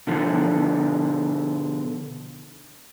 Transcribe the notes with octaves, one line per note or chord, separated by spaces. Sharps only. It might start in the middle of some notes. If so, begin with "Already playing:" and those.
B2 D3 F3